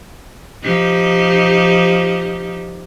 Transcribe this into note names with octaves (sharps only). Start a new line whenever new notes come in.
F3 D#4 G4